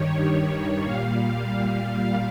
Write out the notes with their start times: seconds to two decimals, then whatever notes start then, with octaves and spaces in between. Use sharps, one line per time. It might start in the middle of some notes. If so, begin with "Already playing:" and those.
Already playing: G2 D#3 G3 C#5
0.84 A#2 G3 F5